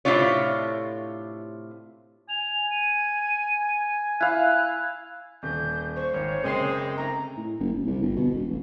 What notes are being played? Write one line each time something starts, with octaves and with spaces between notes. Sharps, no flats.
A2 C3 A3 D4 F4 C#5
G#5 F7
D#7
E4 F5 F#6
D#1 G6
C5 C#6
G#1 C#5
F#1 G#3 C4 C7
G#2 A3 A#5
A2
F#1
D1
C2
G1
B2
E1
A1